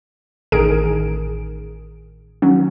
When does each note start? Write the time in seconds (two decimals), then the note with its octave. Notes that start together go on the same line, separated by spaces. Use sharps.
0.52 A1 D#3 G#4 A#4 D7
2.42 D#3 F#3 C#4